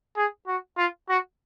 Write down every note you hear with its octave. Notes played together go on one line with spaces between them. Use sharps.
G#4
F#4
F4
F#4